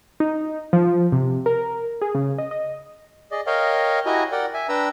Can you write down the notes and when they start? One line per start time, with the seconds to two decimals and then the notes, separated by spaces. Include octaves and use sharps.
0.20 D#4
0.73 F3
1.12 C3
1.46 A#4
2.02 G#4
2.15 C#3
2.38 D#5
2.51 D#5
3.31 G#4 D5 D#5
3.47 A#4 C#5 D#5 F5 G5
4.06 E4 F#4 G4 D#5 G#5 A#5
4.32 A#4 D5 F#5 G5
4.54 E5 G#5
4.69 D4 B4 G5 A#5 E6